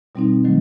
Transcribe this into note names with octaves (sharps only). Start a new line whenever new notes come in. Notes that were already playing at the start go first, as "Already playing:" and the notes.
B2 G3 C4 D#4
D#3 F#3 A3